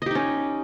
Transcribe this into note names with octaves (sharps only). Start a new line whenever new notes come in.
C#4 D#4 G4 D#5